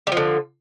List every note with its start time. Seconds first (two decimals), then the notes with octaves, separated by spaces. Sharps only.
0.07 G3
0.12 F3
0.17 D3